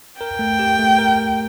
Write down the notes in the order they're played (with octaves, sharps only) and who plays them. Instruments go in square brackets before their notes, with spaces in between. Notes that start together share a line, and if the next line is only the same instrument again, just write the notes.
[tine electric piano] A#4 [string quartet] G5
[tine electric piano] A3
G4
A3
A#4
A#4